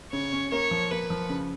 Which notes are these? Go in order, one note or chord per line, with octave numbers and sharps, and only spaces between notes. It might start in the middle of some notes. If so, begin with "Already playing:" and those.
C#3 C#5
C#4
A#3 C#5
F3
A#3 B4
F3
C#3